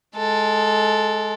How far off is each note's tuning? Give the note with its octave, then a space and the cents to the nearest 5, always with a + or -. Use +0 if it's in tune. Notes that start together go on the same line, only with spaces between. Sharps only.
G#3 +20 A4 +0